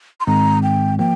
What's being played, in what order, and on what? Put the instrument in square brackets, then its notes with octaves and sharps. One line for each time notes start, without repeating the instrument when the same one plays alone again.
[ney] C6
[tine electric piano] G#2 D#3 G#3 C4 [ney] A#5
[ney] G5
[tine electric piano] F3 A#3 [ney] G5